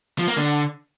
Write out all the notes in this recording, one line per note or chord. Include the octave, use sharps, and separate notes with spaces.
F3
A#3
D3